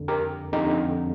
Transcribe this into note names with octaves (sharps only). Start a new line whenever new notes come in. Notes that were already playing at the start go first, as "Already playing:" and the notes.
Already playing: F2 D3
G4 A#4
F2 D3 D#4 G4